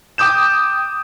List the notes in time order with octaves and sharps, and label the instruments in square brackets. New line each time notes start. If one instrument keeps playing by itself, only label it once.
[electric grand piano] G5 D6 D#6 G6 E7